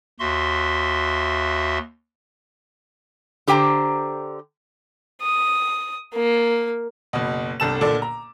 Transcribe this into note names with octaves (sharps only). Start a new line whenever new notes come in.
D#2 F#4 E5 C6
D3 G4 C5 G5 G#5 A#5
D#6
A#3
F#1 B2
G1 C2 D3 A5 E6 E7
F#1 A#2 D3 A4 D5 D6
A#5